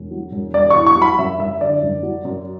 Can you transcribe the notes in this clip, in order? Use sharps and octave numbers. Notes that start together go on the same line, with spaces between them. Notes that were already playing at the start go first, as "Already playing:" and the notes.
Already playing: E1
F#3
E1
E1 D5
C#6
E2
C#6
F#3
B5
F#2 E5
F#1 E5
D3 D5
F#1
F#3
F#2